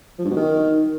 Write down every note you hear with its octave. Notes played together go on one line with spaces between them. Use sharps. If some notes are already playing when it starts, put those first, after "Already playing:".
F3
G2
B2
D#3